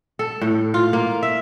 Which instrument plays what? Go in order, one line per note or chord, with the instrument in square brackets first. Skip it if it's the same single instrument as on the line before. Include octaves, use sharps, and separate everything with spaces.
[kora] A4
A2
F4
A#3
E5